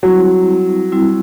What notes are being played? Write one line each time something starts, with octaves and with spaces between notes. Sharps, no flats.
F#3 G3 C4 E4
G3 C4 E4